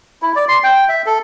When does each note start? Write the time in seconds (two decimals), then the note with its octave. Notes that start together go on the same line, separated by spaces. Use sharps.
0.22 E4
0.36 D5
0.49 C6
0.64 G5
0.89 E5
1.06 A4